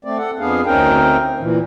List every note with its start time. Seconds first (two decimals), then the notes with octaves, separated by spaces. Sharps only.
0.05 A3 C4 D5
0.18 A4 F#5
0.39 F2 B3 D4 G#4 F5
0.66 D2 C4 C#4 D#4 A#4 G5
1.40 A#2 E3